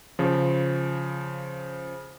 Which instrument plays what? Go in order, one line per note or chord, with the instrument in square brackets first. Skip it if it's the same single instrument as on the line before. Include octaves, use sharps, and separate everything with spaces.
[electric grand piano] C#3 F3